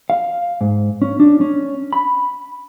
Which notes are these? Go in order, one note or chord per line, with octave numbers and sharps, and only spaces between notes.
F5
G#2
C#4
D4
C#4
B5